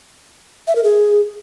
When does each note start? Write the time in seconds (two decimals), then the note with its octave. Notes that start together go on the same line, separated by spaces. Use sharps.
0.67 E5
0.76 A#4
0.84 G#4